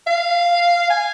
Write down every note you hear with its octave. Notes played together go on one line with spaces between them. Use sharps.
F5
G#5